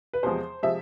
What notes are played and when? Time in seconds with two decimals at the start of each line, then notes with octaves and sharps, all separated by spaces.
0.13 B4
0.23 E2 C3 F3 G#3 C5
0.63 C3 F3 G#3 E5